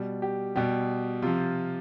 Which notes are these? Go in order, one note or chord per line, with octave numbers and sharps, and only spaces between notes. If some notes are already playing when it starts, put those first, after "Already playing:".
Already playing: B2 G3
G4
B2 G3 G4
C3 F3 F4